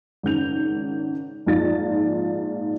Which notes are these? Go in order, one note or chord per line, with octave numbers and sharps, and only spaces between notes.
G#1 C#3 G6 F7
A#1 G#2 D#4 F4 A6